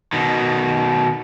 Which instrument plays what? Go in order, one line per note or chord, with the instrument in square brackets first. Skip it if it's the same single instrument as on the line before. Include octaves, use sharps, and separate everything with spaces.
[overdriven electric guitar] B2 D#3